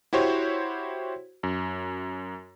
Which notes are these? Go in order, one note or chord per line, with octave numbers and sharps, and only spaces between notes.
E4 F#4 G4 C5 C#5
F#2